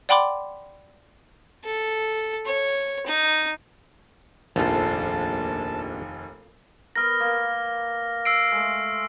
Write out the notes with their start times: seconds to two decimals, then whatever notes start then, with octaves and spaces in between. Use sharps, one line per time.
0.09 D5 F#5 G5 B5 C6 D6
1.64 A4
2.46 C#5
3.06 D#4
4.56 F1 A#1 D#2 F4 A4 A5
6.96 B3 A#4 F6 A#6
7.20 A#3
8.25 E6 C7 D7
8.52 G#3 A3